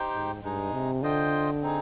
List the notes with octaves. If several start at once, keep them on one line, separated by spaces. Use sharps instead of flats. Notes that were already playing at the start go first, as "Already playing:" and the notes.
Already playing: D#4 G4 C5 G5
G#2
G2 G#3 D#4 G#4
C3
D3 F4 C5 D#5 G5
C4 D#4 G#4